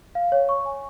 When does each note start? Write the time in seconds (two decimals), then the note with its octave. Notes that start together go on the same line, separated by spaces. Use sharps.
0.15 F5
0.32 C#5
0.49 C#6
0.66 G#5